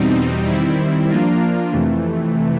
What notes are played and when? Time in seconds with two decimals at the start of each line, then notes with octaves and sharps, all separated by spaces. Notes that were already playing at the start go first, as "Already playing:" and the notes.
Already playing: E2 B2 G3 C4 D#4
0.48 D#3 G3 C4 E4
1.10 F3 A#3 D4 F4 A#4
1.72 F2 C3 E3 A3